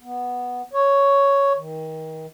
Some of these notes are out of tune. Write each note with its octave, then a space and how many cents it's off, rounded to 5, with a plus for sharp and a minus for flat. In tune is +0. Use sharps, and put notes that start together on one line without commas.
B3 -5
C#5 +5
D#3 +30